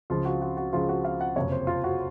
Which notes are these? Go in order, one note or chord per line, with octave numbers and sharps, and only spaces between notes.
C#2 C#3 F3 F4
F#4
F#4
F#4
C#2 C#3 F3 F4
F#4
F5
F#5
F#1 F2 C3 C#5
C5
F4
F#4